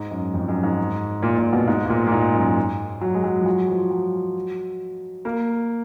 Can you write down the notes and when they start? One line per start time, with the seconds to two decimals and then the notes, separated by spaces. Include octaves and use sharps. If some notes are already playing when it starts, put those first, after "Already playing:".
Already playing: G#2
0.11 F#2
0.34 F2
0.48 F#2
0.63 G#2
1.23 A#2
1.37 A#2
1.53 B2
1.67 G#2
1.86 G#2
1.89 A#2
2.07 A#2
2.12 G#2
2.34 F#2
3.01 F#3
3.14 G#3
3.24 F#3
3.41 F3
3.46 F#3
3.69 F3
3.91 F#3
5.25 A#3